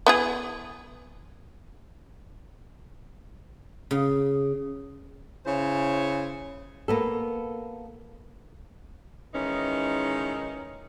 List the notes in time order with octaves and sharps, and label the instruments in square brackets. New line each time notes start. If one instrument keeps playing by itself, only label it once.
[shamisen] B3 E4 G#4
[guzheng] C#3
[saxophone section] C#3 E4 C5 C#5
[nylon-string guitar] A#3 B3 A4
[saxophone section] D#3 E3 G#3 C#4 D#4